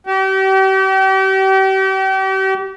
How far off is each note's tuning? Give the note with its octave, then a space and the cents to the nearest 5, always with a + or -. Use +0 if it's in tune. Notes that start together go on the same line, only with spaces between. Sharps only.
G4 -40